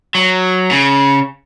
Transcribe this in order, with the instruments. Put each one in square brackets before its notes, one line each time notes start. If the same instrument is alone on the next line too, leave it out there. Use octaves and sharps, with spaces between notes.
[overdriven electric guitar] F#3
C#3